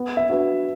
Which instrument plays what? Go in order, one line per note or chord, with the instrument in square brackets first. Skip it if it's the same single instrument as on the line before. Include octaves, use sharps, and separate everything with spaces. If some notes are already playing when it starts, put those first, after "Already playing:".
Already playing: [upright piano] B3
[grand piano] E5
[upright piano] D4 F#4 B4